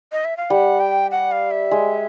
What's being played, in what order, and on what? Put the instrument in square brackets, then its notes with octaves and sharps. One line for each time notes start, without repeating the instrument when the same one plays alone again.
[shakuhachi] D#5
E5
F5
[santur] G3 [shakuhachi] F#5
[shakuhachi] G5
F#5
F5
E5
[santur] G#3